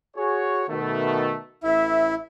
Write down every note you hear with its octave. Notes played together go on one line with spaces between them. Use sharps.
F#4 G#4 C#5
B2 D#3 A3
A1 E4 E5